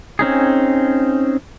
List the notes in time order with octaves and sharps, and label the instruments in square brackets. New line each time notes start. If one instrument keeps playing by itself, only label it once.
[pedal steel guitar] C4 C#4 D#4 G#4